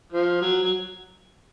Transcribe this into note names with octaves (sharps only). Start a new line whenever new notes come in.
F3
F#3
F#3